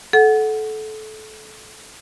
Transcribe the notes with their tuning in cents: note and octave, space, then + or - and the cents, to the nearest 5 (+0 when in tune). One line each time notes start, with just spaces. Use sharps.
A4 -25 F#5 +0